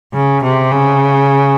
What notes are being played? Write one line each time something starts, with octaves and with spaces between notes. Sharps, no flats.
C#3
C3
C#3